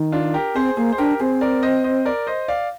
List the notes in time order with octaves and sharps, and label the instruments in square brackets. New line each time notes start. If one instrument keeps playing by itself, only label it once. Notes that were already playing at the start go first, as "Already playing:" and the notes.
Already playing: [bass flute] D#3
[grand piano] D4 F4
G4 A#4
[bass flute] C4 [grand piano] G#4 C5
[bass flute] A#3 [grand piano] G#4 C5
[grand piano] C5
[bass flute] D4 [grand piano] G4 A#4
[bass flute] C4 [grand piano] G#4 C5
[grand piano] A#4 D5
C5 D#5
C5 D#5
A#4 D5
C5 D#5
D5 F5